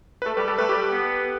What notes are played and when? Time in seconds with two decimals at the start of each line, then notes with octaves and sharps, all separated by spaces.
0.22 B4
0.25 A3 A4
0.37 G3 B4
0.47 G3 A4
0.58 A3 B4
0.69 G3 G4
0.91 B3